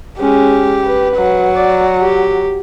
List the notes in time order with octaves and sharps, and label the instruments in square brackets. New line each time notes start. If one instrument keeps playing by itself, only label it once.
[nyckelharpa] G#3 C#4 [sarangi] G4
[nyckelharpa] B4
[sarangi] F#3
[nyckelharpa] D5
G4